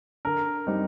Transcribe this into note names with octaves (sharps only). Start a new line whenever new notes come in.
D3 A#4
G3 C4 D#4